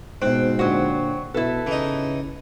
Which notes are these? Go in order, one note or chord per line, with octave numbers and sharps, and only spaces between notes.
G#2 B2 C4 F#6
A#2 D3 F#3 F#4
B2 E4 A4 B4
C#3 E3 D#4